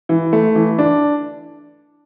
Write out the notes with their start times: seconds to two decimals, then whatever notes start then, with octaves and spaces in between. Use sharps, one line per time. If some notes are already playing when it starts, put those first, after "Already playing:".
0.09 E3
0.33 A3
0.55 E3
0.79 D4